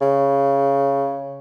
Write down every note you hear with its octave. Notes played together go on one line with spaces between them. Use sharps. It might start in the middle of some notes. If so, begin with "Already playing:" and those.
C#3